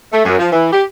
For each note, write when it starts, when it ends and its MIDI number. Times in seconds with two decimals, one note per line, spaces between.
0.12 0.22 57
0.25 0.38 42
0.39 0.50 53
0.52 0.71 52
0.73 0.84 67